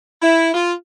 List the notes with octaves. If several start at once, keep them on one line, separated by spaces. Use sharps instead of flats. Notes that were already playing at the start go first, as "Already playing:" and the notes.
E4
F4